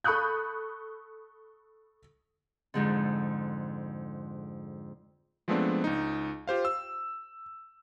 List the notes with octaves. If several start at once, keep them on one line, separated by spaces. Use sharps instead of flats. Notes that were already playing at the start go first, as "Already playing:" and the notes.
A4 B5 C#6 D#6 F#6 G6
F2 G#2 D3
F3 G#3 A3 B3 C4 D4
C#2 D#4
F4 G4 C5 F5
E6